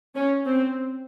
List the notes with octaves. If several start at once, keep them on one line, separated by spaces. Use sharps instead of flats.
C#4
C4